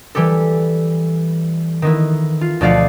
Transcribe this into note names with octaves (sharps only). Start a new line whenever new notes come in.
E3 G3 G4 A4
D#3 B3 E4
F4
D2 B2 F3 D5 F5 F#5